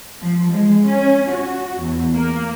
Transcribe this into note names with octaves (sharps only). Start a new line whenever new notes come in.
F3
G#3
C#4
F#4
E2
A#3